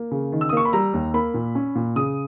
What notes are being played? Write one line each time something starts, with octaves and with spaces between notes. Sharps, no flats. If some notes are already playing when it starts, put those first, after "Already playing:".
Already playing: A#3
C#3
D#3
E6
D#6
A#3 C#6
B5
G3 A#5
D#2
A#3 B5
A#2
C#4
A#2
C#3 D#6